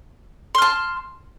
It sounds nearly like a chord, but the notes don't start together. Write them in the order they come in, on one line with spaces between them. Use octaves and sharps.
C6 F6 A5